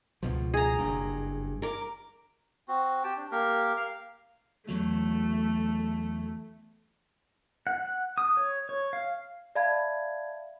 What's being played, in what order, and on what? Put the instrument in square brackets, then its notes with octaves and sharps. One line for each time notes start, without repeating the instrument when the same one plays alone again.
[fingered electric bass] C#2 B2 F3
[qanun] G#4 A#5
[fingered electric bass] F#1 G2
[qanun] A#4 D6
[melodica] C4 F#4
G4 G5 A5
D4
A#3 G4 A#4
A#4 F5
[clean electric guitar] E2 F#3 [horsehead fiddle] A3
[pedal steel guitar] F#5
F#5
D#6
C#5
C#5
F5
[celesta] D5 E5 F5 A5 B5 G#6